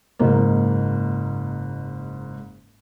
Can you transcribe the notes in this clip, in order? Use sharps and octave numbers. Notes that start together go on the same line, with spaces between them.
F#1 G#2 A#3